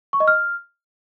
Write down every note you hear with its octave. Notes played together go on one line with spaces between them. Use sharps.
C#6
D#5
F6